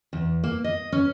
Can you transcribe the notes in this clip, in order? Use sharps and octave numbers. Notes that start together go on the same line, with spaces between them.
E2
A#3
D#5
C#4